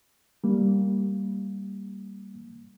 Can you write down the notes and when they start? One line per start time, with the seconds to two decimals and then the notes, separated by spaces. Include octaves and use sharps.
0.44 G3 A#3